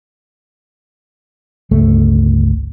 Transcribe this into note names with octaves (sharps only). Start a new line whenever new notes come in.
G1 C#2 A3